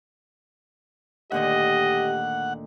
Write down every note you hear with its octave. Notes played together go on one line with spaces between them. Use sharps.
D2 A#2 D#3 G4 D#5 F#5